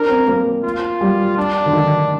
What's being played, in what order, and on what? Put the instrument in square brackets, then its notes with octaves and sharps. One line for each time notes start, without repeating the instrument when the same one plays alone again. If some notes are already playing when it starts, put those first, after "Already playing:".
Already playing: [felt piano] D4 [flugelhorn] A#4
[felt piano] C4
A#3
[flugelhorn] F4
[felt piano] G3
[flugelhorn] D4
[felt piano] D3
D#3